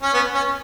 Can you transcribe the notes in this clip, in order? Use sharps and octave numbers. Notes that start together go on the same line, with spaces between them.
C#4
B3
C#4